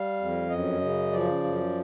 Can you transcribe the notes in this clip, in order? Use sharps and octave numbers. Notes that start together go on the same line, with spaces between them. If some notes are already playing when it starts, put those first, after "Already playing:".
Already playing: G3 F5
F2
F#2 D#5
C#3
F3 D5
F#2